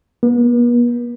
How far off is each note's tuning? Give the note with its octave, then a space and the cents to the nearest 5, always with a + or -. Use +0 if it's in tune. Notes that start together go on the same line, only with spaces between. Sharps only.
B3 -45